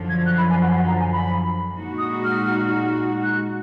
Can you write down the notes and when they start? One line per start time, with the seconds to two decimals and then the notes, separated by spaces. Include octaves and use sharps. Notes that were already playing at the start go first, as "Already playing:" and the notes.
Already playing: F#2 D3 F3
0.09 G#6
0.26 F#6
0.38 B5
0.50 G#5
0.63 F#5
0.76 F#5
0.87 A#5
0.99 G#5
1.13 B5
1.74 A#2 G#3 D#4 F#4
1.98 D#6
2.24 F6
3.23 F#6